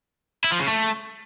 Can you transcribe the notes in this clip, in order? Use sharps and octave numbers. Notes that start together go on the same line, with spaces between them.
E4
F3
C#3
A3